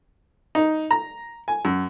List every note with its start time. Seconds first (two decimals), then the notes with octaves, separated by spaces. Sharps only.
0.55 D#4
0.91 A#5
1.48 G#5
1.65 F#2